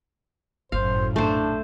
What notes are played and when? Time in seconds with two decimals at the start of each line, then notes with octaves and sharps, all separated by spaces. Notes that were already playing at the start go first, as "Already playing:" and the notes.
0.72 G1 F#2 A2 E4 C5 F5
1.16 A#1 B2 A3 D4 C5